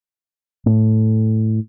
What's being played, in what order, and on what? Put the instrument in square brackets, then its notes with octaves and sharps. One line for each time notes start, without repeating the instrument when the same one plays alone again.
[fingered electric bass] A2